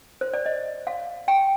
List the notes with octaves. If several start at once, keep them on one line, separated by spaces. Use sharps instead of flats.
C5
D5
D#5
F5
G5